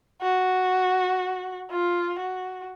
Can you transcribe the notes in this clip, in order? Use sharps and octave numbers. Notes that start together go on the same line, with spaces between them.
F#4
F4
F#4